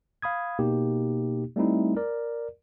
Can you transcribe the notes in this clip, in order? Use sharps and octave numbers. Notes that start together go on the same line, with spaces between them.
F5 B5 D#6 G#6
B2 A#3 D#4 G4
G3 A3 C4 D#4 E4
A#4 D5